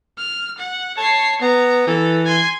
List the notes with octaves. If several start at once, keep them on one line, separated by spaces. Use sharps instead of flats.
F6
F#5
C#5 A5 C7
B3 A#5
E3 A4
G#5 C6